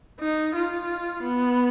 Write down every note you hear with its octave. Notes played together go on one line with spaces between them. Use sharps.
D#4
F4
B3